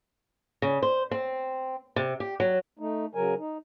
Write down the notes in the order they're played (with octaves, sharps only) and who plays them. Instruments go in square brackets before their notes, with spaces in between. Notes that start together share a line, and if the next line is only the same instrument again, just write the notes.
[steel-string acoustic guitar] C#3
C5
C4
C3
G4
F#3
[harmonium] A3 D#4
C#3 F#3 A#4 G#5
D#4